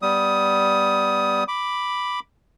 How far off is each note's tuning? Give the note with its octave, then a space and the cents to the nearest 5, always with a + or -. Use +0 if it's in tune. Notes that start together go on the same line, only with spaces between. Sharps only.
G3 +0 B3 +0 D#6 +15
B5 +0 D6 +0